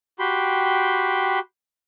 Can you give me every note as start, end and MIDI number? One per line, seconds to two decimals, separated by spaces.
0.19 1.39 66
0.19 1.39 67
0.19 1.39 79
0.19 1.39 83
0.19 1.39 84